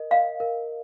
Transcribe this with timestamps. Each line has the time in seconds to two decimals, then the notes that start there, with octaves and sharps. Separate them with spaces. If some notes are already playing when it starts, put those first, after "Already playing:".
Already playing: A#4 D#5
0.11 D#5 F5
0.40 A#4